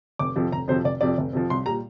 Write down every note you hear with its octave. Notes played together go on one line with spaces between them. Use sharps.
F1 D6
F2 C3 F3
F1 A#5
F2 C3 F3 C5
F1 D5
F2 C3 F3 D5
F1
F2 C3 F3
C2 C6
A#2 G3 A#5